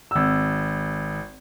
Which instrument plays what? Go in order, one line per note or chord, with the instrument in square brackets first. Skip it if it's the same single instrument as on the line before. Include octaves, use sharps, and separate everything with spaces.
[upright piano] G#1 E6